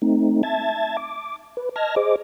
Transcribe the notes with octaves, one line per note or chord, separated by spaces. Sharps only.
A3 C4 D#4
E5 A5 G#6 A6
D6
B4
D#5 A5 F6 G#6 A#6
G#4 C5 D#5 D6